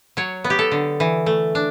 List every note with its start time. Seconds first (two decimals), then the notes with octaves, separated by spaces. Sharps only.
0.17 F#3 C#5
0.44 B3
0.50 G4
0.59 A4
0.71 D3
1.00 E3
1.26 A3
1.55 D4